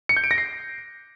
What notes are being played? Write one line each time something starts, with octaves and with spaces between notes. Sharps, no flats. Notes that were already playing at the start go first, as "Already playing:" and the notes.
C#7
G6
D7
A#6
C7